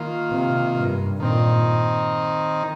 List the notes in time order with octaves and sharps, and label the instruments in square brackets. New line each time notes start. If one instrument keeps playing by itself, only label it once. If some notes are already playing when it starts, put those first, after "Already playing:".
Already playing: [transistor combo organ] D#3 A#3 F4
[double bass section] C3
G2
[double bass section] A#2 [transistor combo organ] D#3 C4 D#4